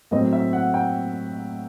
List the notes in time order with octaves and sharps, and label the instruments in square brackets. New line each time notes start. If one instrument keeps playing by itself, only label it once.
[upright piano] A2 F#3 C4 D#5
E5
F#5
G5